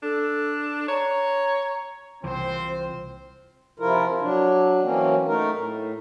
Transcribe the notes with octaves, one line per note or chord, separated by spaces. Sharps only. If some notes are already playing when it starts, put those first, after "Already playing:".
D4 A4
C#5 A#5
C2 E3 C4 F4 C5
C3 F3 E4 F4 A#4
F#3 D4
E3 F#3 A#3 C4 C#4
A3 D#4 A#4
A2